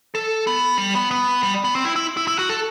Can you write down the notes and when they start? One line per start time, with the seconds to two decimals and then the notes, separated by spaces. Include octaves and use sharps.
0.15 A4
0.47 B3
0.78 G3
0.95 B3
1.11 B3
1.43 G3
1.64 B3
1.75 C4
1.85 E4
1.96 E4
2.17 E4
2.28 E4
2.39 F#4
2.49 A4